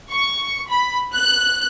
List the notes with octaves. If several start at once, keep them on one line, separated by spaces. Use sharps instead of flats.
C#6
B5
F#6